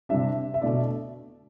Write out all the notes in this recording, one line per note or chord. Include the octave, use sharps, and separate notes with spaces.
C3 G3 D4 E5
E5
B2 A3 D4 D5